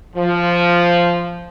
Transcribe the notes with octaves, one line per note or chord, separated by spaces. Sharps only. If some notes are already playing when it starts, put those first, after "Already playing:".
F3